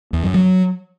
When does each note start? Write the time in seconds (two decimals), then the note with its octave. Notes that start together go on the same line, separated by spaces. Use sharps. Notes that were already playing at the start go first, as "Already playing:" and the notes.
0.13 E2
0.23 F#2
0.34 F#3